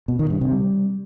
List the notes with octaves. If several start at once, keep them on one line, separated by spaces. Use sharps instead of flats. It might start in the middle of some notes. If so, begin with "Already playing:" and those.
B2
D#3
G2
C3
G3